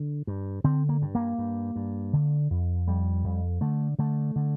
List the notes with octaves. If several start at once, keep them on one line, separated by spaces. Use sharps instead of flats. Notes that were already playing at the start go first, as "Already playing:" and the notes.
Already playing: D3
G2
D3 C4
A#3
G2
A#3
G2
G2
D3
F2
F2 G3
F2
D3 A3
D3 A3
D3